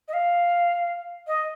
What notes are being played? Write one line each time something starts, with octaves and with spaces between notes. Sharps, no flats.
D#5
F5
D#5